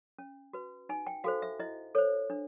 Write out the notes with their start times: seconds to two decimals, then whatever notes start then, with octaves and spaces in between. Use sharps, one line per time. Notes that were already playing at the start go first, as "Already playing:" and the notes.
0.18 C#4
0.53 F#4 B4
0.89 D#4 G#5
1.07 G5
1.24 F#4 A4 C5 F5
1.42 E5
1.59 E4 D#5
1.95 A4 C5 C#5
2.30 D4